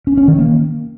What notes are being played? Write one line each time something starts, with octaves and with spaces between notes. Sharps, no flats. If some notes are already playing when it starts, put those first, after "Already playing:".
C#4
C#4
D#3
A#3